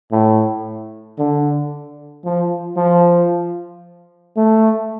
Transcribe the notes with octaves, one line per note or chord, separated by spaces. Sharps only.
A2
D3
F3
F3
A3